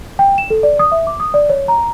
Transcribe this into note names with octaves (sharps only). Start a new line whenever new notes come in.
G5
E7
A4
D5
D#6
E5
D6
D#6
D5
C#5
A#5